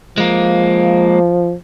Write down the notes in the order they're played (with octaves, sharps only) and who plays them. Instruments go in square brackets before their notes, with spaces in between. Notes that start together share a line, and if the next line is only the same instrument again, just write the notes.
[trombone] F3 [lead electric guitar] G#3 A#3